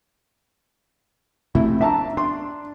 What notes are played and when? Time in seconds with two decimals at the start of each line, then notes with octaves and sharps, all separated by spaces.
1.55 C3 A3 E4
1.81 D4 E5 A5 A#5
2.17 D4 C6